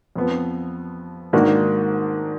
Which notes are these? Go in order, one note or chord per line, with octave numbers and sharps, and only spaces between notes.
F2 F3 B3
G#2 D#3 A#3 D4 F#4